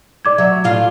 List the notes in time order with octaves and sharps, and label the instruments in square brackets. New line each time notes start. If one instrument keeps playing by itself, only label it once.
[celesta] D5 D6 G#6
[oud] F#3 E5
A2 F4 F5